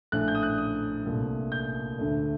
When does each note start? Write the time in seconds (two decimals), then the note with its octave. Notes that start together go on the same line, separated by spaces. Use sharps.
0.12 A#1 A2 A3 F#6
0.28 G6
0.35 D#6
0.43 F#6
0.58 D#6
1.05 C2 A#2 A3
1.52 G6
1.99 D2 D3 A3